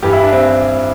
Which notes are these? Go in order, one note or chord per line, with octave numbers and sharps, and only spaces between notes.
G2 E3 G3 G4
E4
D4
C4
C4